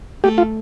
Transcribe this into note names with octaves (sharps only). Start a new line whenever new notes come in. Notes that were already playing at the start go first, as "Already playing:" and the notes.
A3 G4
F4